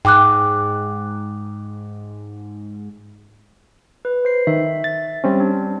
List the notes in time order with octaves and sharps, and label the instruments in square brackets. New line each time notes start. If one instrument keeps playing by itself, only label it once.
[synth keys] G#2 [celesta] G5 D6 F#6
[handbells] B4
C5 C7
[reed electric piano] D#3 [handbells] E5
[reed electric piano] A6
G3 C4 C#4
[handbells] D4